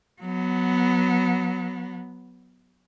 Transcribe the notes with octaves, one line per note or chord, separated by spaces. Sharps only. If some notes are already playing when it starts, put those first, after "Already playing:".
F#3 B3